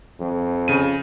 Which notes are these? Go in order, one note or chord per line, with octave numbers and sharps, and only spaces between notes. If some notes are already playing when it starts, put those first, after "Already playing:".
F2
C#3 D#7